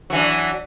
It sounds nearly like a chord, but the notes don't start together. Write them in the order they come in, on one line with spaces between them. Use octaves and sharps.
F#3 E3 D4